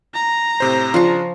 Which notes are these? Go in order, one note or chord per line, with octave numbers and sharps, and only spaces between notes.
A#5
A2 C3 C5
C#3 F3 D4 C#6 C7